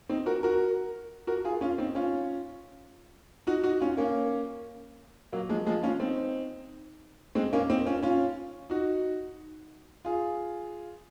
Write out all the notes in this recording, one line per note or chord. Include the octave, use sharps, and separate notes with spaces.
C4 D#4
F#4 A#4
F#4 A#4
F#4 A#4
F4 G#4
C#4 F4
C4 D#4
C#4 F4
D#4 F#4
D#4 F#4
C#4 F4
A#3 C#4
F#3 A#3
F3 G#3
F3 G#3
C#4 F4
C4 D#4
G#3 C4
A#3 C#4
C4 D#4
C#4 F4
C#4 F4
D#4 F#4
F4 G#4